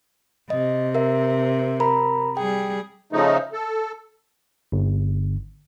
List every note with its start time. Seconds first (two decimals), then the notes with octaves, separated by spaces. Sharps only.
0.50 C3 D#5
0.95 A#4 E5
1.80 A#4 A#5 B5
2.37 G3 G#4 G5
3.13 C#3 F3 A3 D#4
3.53 A4
4.72 G1